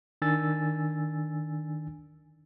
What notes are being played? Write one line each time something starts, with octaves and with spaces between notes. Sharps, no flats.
D#3 D4 G#5 E6 A6